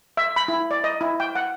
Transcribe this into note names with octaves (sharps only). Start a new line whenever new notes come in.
E5
B5
E4
D5
D#5
E4
G5
F#5